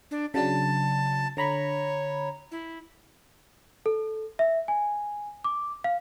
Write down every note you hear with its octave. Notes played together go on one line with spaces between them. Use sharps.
D4
C#3 F#3 D4 A5
D3 C#5 A#5 B5
E4
A4
E5
G#5
D6
F5